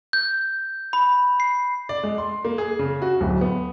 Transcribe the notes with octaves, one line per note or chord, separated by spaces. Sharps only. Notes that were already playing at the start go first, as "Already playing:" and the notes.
G6
B5
C7
D5
G#3
C6
A#3
G#4
C#3
F#4
D1
B3